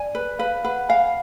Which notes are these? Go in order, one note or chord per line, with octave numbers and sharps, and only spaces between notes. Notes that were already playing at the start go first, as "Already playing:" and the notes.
Already playing: D5 G#5
B4
B4 F5
B4 F#5
F5 G#5